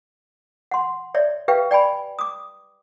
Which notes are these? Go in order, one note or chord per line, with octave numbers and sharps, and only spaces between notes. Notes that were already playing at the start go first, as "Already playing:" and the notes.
F#5 C6
C#5 D5 E5
G4 B4 E5 F5 G5
D5 G5 G#5 B5
D6 D#6